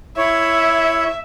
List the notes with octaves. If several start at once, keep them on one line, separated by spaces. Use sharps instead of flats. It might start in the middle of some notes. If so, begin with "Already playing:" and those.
E4 C#5 E5